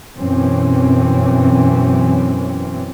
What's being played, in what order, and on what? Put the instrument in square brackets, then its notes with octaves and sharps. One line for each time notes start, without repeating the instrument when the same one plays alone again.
[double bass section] F#2 B2 E3 C4 C#4